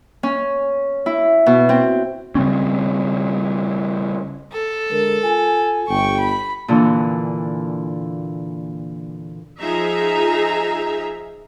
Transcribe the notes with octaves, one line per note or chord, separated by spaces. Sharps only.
C#4
E4
B2
C4
C#3 G3 C4 C#4
A4
D3 G#3 A#4
F4 G#5
G1 G5 C#6
B5
A#2 D3 E3
F3 D#4 G#4 E5 A#5